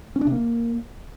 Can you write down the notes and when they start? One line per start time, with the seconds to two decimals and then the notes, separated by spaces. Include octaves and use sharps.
0.16 C#4
0.21 D4
0.27 C3
0.32 A#3